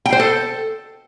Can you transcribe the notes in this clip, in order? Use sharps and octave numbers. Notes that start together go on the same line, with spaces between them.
G5
C5
A4